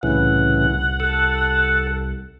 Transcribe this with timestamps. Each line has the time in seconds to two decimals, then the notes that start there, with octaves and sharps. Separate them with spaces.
0.03 C2 A2 C#3 E3 F#5
1.00 A4